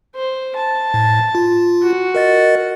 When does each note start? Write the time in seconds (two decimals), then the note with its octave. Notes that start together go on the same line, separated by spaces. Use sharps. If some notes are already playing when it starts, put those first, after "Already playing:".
0.15 C5
0.56 A5
0.94 A2
1.35 F4
1.83 F#4
2.15 A#4 D#5 A6